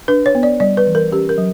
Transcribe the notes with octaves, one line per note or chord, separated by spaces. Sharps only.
D4 B4
C#5
B3
D5
G3 D5
B4
E3
A#4
C#4 G4
A#4
F#3